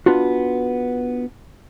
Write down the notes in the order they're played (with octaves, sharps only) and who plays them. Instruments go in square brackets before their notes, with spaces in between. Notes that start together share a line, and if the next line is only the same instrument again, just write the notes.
[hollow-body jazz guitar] B3 D4 F4 F#4